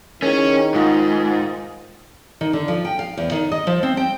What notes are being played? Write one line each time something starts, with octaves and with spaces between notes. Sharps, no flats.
D#3 C#4 E4 G#4 A#4
G#2 D#4 F4 F5
D#3
D3
F3
G5
F5
E2
D#3
D#5
F3
C4
G5